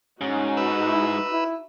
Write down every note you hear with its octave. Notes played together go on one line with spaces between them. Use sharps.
G#2 C#4 D#4 F#4
B4 E6
E4
E4